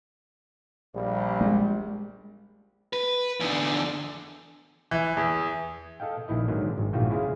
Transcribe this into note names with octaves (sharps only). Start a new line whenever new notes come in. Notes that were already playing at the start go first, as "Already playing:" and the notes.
A#1 G3
G#3
B4
E2 D3
E3
E2
A4 D#5 F5 G5
A#1 D#3 E4 D#5
G#2 D3 D#3 F#3
G#1
A#1 E2 G#2 F4 F#4 G5
C#3 E4 G#4 F5